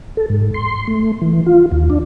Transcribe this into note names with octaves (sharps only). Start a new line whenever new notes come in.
A4
G#2
C6
A3
E3
F4
D#2
D4